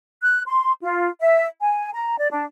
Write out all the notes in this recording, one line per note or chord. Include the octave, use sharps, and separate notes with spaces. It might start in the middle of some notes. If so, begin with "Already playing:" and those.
F#6
C6
F4
E5
G#5
A#5
D5
D4